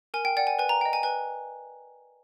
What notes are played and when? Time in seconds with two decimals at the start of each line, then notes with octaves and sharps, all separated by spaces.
0.14 A#4 G#5
0.25 G5
0.37 D5 F#5 G5
0.47 G#5
0.59 B4 G#5
0.69 A#5
0.81 D#5 G5
0.93 G#5
1.03 B4 G#5